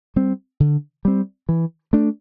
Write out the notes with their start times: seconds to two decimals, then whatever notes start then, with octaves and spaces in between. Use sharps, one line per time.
0.16 G3 C4
0.60 D3
1.05 G3 C4
1.49 E3
1.93 A3 D4